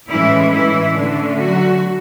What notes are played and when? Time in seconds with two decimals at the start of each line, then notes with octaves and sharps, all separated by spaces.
0.09 A2 E3 G#3 C#4 E4
0.52 E3 E4
0.96 D3 A3 C#4 D4
1.40 F#3 F#4